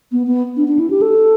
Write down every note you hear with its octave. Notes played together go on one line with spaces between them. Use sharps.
B3
B3
D4
D4
E4
G4
A4